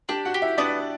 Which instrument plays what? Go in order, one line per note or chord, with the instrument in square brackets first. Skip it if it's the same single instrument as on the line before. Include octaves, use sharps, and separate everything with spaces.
[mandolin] D4 [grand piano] G4 G5
[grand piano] F#4 F#5
[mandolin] G4
[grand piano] E4 E5
[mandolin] B3 [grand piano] D4 D5